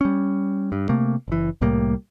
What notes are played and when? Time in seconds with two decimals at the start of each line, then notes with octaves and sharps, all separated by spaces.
0.01 G3 C#4
0.72 G2
0.89 C3 A3 A#3
1.28 F#1 E3
1.61 C2 A2 G3 A#3